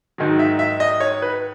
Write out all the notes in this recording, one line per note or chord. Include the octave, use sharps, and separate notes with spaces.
G#2 D#3 F#3
E5
E5
D#5
C#5
B4